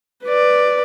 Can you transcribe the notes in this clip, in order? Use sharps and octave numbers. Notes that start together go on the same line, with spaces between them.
B4 D5